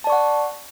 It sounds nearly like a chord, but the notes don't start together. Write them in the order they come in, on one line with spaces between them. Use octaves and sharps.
A5 D5 C#6 F#5